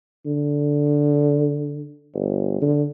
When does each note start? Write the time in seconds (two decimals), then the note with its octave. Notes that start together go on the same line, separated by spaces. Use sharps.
0.26 D3
2.14 G1
2.62 D3